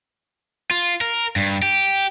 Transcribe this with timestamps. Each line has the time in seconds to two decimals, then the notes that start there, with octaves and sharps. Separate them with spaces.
0.71 F4
1.01 A#4
1.36 G2
1.62 G4